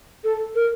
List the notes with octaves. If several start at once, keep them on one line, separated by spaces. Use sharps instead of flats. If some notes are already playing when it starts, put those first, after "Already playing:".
A4
A#4